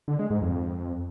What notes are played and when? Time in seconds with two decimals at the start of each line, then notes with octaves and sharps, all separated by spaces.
0.08 D3
0.19 G#3
0.30 G#2
0.42 F2